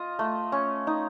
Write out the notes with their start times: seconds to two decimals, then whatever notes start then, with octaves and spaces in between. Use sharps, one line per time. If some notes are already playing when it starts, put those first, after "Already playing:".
Already playing: F4 D#5
0.19 A3
0.52 C#4
0.87 D#4